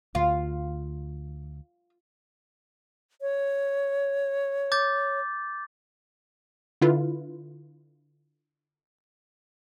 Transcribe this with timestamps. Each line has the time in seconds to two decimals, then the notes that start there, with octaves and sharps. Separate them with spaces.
0.15 D2 F4
3.21 C#5
4.72 D6 G6 A6
6.81 D3 E4 F4 B4